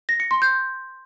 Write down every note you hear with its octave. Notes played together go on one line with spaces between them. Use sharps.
A#6
C#7
C6
G6